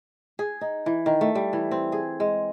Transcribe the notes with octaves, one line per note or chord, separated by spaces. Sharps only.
G#4
D#4
E3
D#3
A3
G3
E3
C4
G#4
G#3